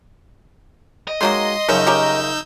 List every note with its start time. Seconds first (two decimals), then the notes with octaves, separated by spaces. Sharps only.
1.08 D#5
1.21 D#3 F#3 G#3 A#3 C6 D#6
1.69 F#2 C#3 F3 C#4 D#4 E6 G6
1.87 C#4 G4 A#4